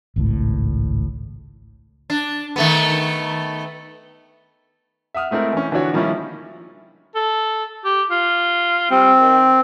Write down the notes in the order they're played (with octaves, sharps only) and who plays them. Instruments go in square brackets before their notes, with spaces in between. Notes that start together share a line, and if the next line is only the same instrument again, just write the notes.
[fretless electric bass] G#1 C#2 A2
[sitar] D4
D#3 A3 B3
[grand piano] E5 F#5 D#6 F6
G#3 A3 C4 E4 A#4
E3 C#4
D3 E3 F3 D4 F#4 C#5
D#3 F3 G3 A#3 C#4 E4
[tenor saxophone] A4
G4
F4
[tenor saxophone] G3 [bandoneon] C4
[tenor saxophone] D#3